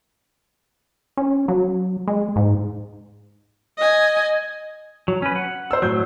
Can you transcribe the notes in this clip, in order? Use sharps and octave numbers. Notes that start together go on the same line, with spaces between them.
C#4
F#3
G#3
G#2
D#5 G#5
F#3
C#4 B4
F#5
C5 E6
A2 F#3 G6